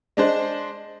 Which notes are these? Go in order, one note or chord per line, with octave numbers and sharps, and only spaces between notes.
G#3 D4 C5